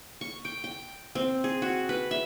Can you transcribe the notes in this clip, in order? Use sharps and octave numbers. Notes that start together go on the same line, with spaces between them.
C#6
G5
G5
C4
G#4
F#4
B4
E5